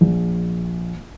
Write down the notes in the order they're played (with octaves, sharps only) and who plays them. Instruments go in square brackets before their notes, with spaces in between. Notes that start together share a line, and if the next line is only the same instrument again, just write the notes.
[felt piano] A#1